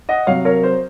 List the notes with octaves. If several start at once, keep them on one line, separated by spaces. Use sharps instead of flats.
D#5 F#5
C3 F#3 C#5 F5
A#4 C#5
C5